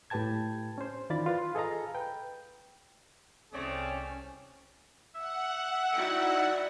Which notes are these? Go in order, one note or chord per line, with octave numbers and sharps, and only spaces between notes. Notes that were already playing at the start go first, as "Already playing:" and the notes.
A2 G4 B4 G5 A5 G#6
C#4 C5
D#3 E3 F4 D5 B5 A6
F4 B4
G#4 A4 D#5 F5 A#5
B4 G5
C2 A3 C4 C#4 G#4 C#5 D5
E5 F#5
D#4 E4 F#4 D5 G5